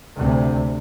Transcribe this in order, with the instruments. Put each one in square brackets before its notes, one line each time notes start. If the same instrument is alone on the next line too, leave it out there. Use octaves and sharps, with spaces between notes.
[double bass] D2 C3